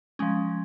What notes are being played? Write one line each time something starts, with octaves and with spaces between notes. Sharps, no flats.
F3 G#3 C#4